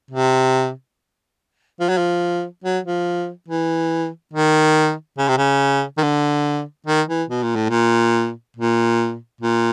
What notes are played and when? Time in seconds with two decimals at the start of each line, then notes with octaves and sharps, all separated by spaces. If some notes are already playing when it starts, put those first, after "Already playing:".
0.11 C3
1.80 F3
1.89 F#3
1.97 F3
2.64 F#3
2.85 F3
3.48 E3
4.33 D#3
5.17 C#3
5.28 C3
5.38 C#3
5.97 D#3
6.03 D3
6.86 D#3
7.08 E3
7.29 B2
7.42 A#2
7.55 A2
7.69 A#2
8.57 A#2
9.41 A#2